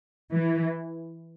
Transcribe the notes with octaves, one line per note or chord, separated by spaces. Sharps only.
E3